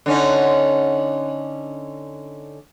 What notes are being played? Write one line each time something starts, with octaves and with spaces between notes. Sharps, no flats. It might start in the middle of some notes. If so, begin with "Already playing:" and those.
D3 C#4 D#4